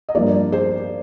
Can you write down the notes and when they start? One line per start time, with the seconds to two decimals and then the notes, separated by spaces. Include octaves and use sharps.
0.09 D#5
0.15 G2 F3 A#3 A#4 D5
0.52 G#4 C5